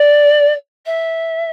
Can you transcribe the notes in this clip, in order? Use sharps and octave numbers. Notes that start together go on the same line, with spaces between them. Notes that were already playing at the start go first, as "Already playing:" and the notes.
Already playing: D5
E5